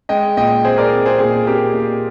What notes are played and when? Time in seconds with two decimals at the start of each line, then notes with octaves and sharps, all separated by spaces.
0.09 G#3 D#5 G5
0.37 A#2 D#5 G5
0.65 C4 G#4 C5
0.78 A#4 D5
0.92 C4
1.06 G#4 C5
1.19 A#2 G#4
1.47 C4 G4 A#4
1.74 A#2